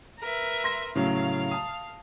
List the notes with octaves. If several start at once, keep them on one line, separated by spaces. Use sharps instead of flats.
A#4 B4 E5
C6 A#6
A2 C#3 F#3 F5
A5 D#6